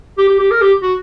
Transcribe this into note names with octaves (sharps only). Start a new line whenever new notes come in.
G4
G4
G4
A#4
G4
F#4